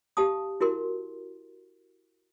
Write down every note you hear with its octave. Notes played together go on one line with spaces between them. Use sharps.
G4 F5 A5 D#6
E4 F#4 A#4 C6